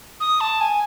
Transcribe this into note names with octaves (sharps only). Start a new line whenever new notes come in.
D#6
A5
G#5